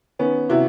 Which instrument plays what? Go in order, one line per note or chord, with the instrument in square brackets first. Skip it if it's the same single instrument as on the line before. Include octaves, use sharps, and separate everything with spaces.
[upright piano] D#3 B3 C#4
C3 E4 F#4